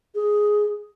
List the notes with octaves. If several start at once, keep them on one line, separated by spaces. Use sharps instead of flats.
G#4